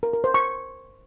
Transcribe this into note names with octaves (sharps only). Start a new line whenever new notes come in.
A#4
A#4
C5
C#6